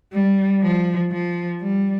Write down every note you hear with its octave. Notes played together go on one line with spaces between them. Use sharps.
G3
F3
F3
G3